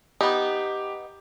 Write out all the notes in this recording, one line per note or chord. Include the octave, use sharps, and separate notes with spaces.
B3 D#4 G4